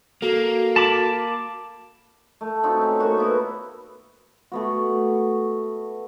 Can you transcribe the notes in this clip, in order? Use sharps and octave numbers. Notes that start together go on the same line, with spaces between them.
A#3 F#4 A4 C7
A5 B5 D6
A3
C4 D#4 F4 F#4
C#4 C#5
A#3 F#4 C5 C#6
B3 E4 F#4
A3 B3 F#4